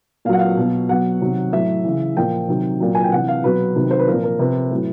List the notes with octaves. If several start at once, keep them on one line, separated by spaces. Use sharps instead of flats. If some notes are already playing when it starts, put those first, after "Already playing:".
A#2 F#3 F5 F#5
F5
B2 F#3
B2 F#3 F#5
C3 D#3 F#3
A2 F#3 E5
C#3 E3
A#2 F3 G5
C3 D#3 F#3
A#2 F#3
G#5
G5
C3 E3 F#5
F5
B2 F#3 B4
C3 D#3 F#3
C5
B4
A#2 F3 A#4
A#4
C3 F3 B4
A2 F#3